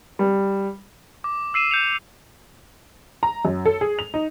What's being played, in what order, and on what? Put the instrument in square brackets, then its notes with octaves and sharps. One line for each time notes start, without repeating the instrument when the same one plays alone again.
[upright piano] G3
[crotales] D6
E6 C7 D#7 E7
G6 C#7 F7
[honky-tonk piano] A#5
F#2
A4
G#4
F7
D#4